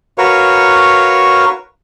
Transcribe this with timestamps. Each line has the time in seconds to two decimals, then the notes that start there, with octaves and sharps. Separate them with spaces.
0.18 F#4 A#4 B4 C#5 F5 C#6